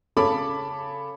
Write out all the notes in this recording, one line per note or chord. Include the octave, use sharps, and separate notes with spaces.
C#3 A4 C#5 B5 D6